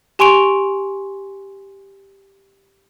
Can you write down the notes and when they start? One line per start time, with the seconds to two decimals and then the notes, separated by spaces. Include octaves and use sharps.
0.19 G4 G#5 C6 C#6 D7 F7